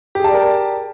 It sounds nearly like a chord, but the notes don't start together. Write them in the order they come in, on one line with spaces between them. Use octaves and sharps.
G4 G#4 A5 D5 A#4